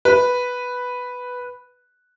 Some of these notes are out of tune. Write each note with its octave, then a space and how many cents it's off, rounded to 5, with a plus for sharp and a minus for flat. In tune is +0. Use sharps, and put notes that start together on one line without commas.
B4 +0